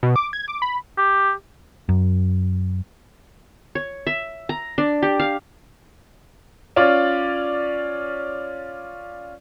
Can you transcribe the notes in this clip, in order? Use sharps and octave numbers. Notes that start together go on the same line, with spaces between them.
B2
D6
G#6
D6
B5
G4
F#2
C#5
E5
A#5
D4
G4
F5
C#4 F4 D5